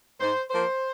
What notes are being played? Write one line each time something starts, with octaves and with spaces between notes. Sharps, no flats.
G#2 C5
F3 A#3 C5